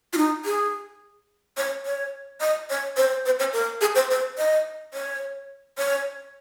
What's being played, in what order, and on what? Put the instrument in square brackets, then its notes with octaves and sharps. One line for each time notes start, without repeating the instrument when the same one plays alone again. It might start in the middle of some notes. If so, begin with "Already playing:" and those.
[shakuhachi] F4
D#4
G#4
C#5
C#5
D#5
C#5
C5
C5
C#5
A#4
G#4
C5
C5
D#5
C#5
C#5